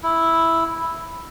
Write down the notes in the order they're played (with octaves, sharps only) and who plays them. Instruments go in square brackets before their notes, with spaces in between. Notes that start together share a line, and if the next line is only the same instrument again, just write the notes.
[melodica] E4